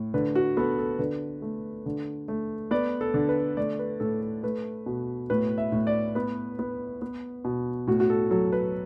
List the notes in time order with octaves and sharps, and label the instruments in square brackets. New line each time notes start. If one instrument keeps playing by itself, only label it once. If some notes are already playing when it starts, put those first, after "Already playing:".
Already playing: [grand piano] A2
D3 B4
F#4
B3 A4
A4
D3 B4
A3
D3
A3
B3 D5
A4
D3
B4
A3 D5
B4
A2 A4
A4
A3 B4
B2
A2 B4
E5
A2
D5
B3 B4
B3
B3
B2
A2 F#4
F#4
A4
F#3 A4
B4